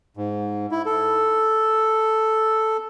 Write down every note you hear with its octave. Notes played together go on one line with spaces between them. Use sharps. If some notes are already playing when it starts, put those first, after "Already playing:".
G#2
E4
A4